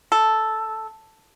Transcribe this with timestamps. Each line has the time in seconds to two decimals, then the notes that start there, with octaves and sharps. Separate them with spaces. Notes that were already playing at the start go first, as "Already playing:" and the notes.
0.12 A4